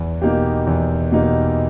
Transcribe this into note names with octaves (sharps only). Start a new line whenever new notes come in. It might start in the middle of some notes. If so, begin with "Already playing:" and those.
Already playing: E2
B2 A#3 D#4 G4
E2
B2 A#3 D#4 G4